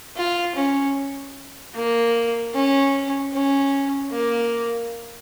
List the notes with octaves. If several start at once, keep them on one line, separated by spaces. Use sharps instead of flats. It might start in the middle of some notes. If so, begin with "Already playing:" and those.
F4
C#4
A#3
C#4
C#4
A#3